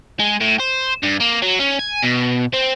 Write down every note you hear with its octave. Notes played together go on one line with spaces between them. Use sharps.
G#3
A2
C5
G2
A#3
F#3
C#4
G#5
B2
C4